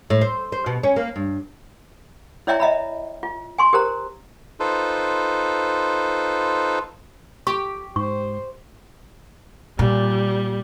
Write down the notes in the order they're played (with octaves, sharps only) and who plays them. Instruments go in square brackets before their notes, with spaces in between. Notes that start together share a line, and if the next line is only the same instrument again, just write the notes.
[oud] A2
C5
C5
B2
C#4
A#3
G2
[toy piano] E4 C#5 D5 E5 G5 A#5
D#5 E5 A#5 B5
F4
G#5 C6 C#6
G4 A#4 C5 A#5
[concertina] D#4 F4 A4 B4 C5
[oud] G4 [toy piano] C#6
[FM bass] G#2 [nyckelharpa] C5 [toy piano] C#6
[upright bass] A#2 [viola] G3